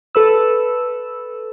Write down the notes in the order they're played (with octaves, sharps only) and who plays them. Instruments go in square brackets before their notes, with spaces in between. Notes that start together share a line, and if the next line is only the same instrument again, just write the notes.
[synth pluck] A4 B4 E6